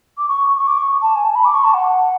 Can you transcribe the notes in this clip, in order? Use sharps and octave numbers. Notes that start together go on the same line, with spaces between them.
D6
C#6
C#6
D6
C#6
A5
G#5
A5
B5
D6
C#6
A5
F#5